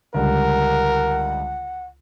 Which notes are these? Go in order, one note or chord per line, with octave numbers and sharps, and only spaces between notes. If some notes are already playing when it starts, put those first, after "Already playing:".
C#2 D3 G3 A#4 F#5